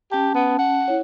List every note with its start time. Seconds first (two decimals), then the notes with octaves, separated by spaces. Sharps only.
0.12 C#4 G4 A5
0.35 B3
0.59 F#5
0.88 E4 C#5